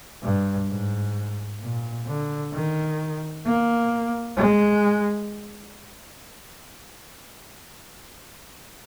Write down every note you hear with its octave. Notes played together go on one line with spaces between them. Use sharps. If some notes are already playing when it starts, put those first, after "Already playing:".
G2
G#2
A#2
D3
D#3
A#3
G#3